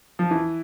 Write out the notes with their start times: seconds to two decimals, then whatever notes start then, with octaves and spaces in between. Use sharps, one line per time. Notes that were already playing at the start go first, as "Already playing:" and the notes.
0.19 F3
0.31 E3